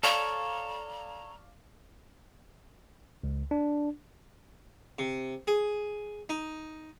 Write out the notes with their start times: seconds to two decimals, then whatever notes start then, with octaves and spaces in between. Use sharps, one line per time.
0.03 A4 C#5 D5 F5 A#5
3.24 C#2
3.51 D4
4.99 C3
5.47 G#4
6.29 D#4